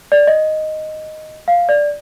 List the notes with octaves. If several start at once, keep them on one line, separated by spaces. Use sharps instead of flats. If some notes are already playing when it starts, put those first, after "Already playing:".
D5
D#5
F5
D5